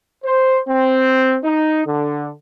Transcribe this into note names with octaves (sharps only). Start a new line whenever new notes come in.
C5
C4
D#4
D3